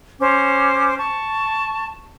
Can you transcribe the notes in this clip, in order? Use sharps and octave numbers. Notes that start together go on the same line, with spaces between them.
C#4 C5 D6
A5 C#6